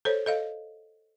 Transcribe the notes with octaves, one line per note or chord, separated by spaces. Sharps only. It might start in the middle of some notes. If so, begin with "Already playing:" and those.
A4 C5 C#5
A4 D#5 F5